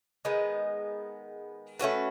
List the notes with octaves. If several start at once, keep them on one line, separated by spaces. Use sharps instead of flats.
D#3 G#3 B3
A3 C#4 F#4 B4